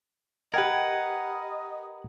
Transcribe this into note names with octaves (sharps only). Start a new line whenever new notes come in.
G4 A#4 B4 D#5 F#5 G5 G#6